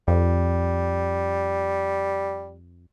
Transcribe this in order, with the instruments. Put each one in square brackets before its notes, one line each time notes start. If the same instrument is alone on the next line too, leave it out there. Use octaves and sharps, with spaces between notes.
[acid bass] F2 [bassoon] G3